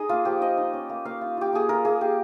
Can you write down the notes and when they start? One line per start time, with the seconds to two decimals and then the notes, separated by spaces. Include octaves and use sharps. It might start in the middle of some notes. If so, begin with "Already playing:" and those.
Already playing: D#4 G#4 D#5
0.09 A#3 F4
0.25 F3 G4
0.41 F3 D#5
0.57 D#4
0.73 C#4
0.89 A#3
1.05 A#3 F5
1.21 F4
1.37 F4 G4
1.53 A#3 G#4
1.69 F4 A#4
1.85 A#3 G#4
2.01 A#3 G4